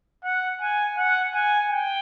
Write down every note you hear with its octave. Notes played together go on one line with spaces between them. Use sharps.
F#5
G#5
F#5
G#5
G5